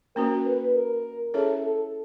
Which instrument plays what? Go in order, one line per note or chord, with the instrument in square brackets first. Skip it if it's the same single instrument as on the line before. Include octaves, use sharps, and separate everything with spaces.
[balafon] A#3 C#4 F#4 [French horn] A#4
[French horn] B4
A#4
[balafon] C#4 E4 G#4 C#5 E5 [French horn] A4
[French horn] A4